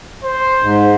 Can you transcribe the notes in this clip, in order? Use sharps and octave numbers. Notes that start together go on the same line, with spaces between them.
C5
G#2